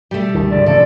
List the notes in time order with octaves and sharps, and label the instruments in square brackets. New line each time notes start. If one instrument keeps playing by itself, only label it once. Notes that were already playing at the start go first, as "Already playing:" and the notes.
[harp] B2 G5 [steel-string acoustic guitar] G3 A3
[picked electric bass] C#2 D3 D#3
[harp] F2 G#2 C#3 [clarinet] D5
[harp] E1 C3 [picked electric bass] E3 A3 C#4 [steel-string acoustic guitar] A4 [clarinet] D5